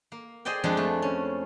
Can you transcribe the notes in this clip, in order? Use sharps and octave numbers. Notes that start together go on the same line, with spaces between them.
A#3
G#4 C5 D5 D#5 G5
F2 F3 G#3 D4 D5
A3
C#4